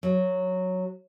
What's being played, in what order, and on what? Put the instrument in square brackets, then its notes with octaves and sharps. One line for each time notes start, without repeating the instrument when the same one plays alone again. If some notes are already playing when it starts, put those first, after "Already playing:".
[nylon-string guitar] F#3